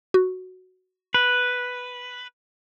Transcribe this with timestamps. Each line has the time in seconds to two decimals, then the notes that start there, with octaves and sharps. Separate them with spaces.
0.14 F#4
1.14 B4